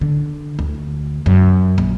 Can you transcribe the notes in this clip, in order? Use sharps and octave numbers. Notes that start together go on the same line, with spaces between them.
D3
D2
F#2
A#1